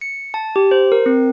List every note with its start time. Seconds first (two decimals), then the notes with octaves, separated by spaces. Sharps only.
0.01 C#7
0.34 A5
0.56 G4
0.71 C5
0.92 A#4
1.06 C4